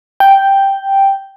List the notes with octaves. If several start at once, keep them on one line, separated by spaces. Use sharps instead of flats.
G5